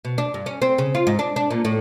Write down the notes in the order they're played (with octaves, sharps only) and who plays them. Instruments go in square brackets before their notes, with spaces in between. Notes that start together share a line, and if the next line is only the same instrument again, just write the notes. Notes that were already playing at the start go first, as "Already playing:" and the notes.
[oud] B2
D4
G2
C#4
C4
C#3
F4
G#2
D4
D4
A#2
A2